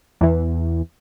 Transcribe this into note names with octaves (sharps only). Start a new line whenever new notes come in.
E2 E3